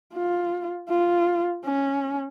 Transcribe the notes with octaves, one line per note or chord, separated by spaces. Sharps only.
F4
F4
C#4